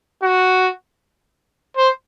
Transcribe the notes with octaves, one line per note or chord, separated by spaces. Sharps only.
F#4
C5